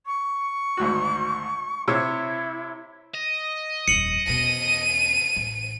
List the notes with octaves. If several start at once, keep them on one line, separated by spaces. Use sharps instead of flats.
C#6
G#1 D2 F#4
C3 E4 C#5 E6
D#5
D#1 F2 C#7 F#7
E2 B2 D#7
A1